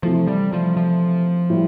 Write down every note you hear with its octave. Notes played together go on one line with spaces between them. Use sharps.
C3 E3 F3 A3
G3
F3
F3
A2 G3